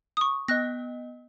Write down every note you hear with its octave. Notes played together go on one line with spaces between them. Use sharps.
C#6 D#6
B3 D#5 F#6 A#6